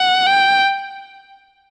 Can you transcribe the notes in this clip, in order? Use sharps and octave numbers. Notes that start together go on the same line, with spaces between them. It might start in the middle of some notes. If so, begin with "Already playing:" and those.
Already playing: F#5
G5